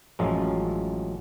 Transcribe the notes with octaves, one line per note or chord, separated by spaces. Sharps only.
A1 F#2 F3 F#3 G#3